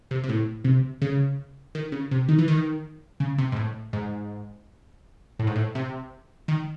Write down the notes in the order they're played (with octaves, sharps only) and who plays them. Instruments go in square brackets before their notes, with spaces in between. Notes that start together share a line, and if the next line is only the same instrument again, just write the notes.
[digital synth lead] C3
C3
A2
C3
C#3
D#3
C#3
C3
D#3
E3
D#3
C#3
C3
G#2
A2
G#2
A2
G#2
A2
C3
D#3